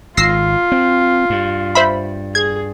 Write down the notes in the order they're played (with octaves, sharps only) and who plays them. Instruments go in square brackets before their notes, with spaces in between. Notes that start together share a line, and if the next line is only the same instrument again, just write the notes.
[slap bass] G#1 [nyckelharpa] F4 [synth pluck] E6 A#6 C7
[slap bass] C4
G2
[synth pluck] C5 E5 B5
[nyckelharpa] G#4 [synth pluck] G#6